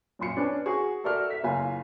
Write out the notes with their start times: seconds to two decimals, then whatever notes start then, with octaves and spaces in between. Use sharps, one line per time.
0.19 F#2 A#2 C6 C#7
0.36 C#4 D4 B4
0.66 F#4 G#4 C#6
1.04 F#4 A4 A#4 D5 E5 F6
1.30 E5 B6
1.43 F#1 F4 G#5 A#5